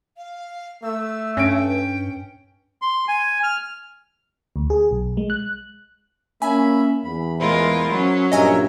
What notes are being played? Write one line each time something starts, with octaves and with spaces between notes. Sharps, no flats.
F5
A3 E6
G2 C#4 G5 D7
C6
G#5
F6
D2
G#4
B1
G#3
F#6
A#3 C#4 E5 G#5 B5
E2 B5
G#3 E4 F4 A#4 C5
F#3 C#4
A#1 G2 A#4 C#5 D#5 E5 G#5 A#5